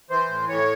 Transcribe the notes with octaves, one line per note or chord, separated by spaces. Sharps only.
E3 C5
A2
A2 C#5